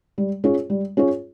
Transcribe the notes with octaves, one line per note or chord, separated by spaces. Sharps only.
G3
C#4 F4 G#4 C#5
G3
C#4 F4 G#4 C#5